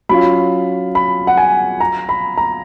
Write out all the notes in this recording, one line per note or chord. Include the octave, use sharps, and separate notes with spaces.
F#3 C#4 F4 B5
B5
F#5
G#5
A#5
B5
A#5